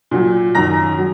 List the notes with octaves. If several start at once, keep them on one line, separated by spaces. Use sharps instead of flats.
A#2 F#3
F#2 D#3 F#3 A#5 A#6
F#3